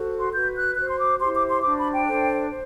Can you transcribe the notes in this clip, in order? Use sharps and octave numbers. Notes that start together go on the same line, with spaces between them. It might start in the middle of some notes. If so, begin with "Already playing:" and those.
Already playing: F#4 A4 C5
C6
F#4 B4 G6
F#6
F#4 C5 F#6
C6
D6
E4 G4 C5 C6
D6
C6
D4 F#4 C5 D6
B5
G5
D4 A4 C5
C5